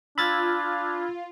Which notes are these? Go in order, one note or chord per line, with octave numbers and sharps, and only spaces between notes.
D4 F4 B5 E6 F6 G#6 A6